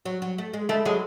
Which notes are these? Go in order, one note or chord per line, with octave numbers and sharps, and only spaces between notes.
F#3
F#3
A3
G#3
G#3 A3
F#3 G#3